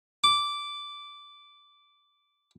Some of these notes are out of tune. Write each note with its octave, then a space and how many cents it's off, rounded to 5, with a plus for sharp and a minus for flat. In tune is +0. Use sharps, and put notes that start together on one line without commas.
D6 -10